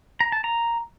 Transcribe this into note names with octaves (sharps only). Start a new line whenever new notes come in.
A#5
A5
A#5